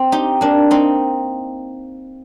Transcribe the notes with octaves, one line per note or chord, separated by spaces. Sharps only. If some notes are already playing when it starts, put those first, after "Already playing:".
Already playing: C4
D#4 G4
A#3 D4
C4 D#4